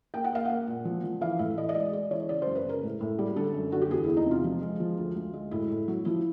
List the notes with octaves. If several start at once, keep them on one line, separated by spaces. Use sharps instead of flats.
A#3 G5
F#5
A#3 F5
A#3 F#5
A#2
F3
F3
E3 F5
A2 E5
E3 D#5
D#5
G#3 D5
G#3 D5
E3 C#5
C#3 D5
F#2 C5
B4
C#3 A#4
A2
A2
G3
D3 A4
F#2
D3 F#4
G4
E2 G#4
E2 E4
D#4
C3 F4
F3
G#3
F3
D2
D2
G#3
A2 E4
A2
F#3
F3 E4